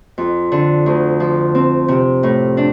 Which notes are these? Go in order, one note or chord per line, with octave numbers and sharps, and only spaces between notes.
F2
D3
D2
F3
C4
C3
A2
D4